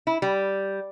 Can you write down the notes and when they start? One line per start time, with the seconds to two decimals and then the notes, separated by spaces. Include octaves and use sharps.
0.07 E4
0.22 G3